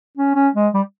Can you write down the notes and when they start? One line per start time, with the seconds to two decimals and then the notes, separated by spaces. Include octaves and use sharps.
0.17 C#4
0.35 C#4
0.55 G#3
0.74 G3